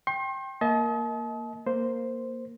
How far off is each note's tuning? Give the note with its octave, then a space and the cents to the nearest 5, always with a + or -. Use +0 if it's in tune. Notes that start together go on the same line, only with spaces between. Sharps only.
G5 +0 C6 +40
A#3 +0 D#5 +35 A5 -35
A#3 +0 C5 +0